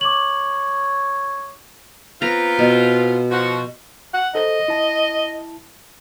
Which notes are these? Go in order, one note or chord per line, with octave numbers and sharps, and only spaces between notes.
C#5 D6 F#7
B3 C4 F4 A#5
B2
F3 F#4
F#5
A4 C5 D#5 A#6
E4 A5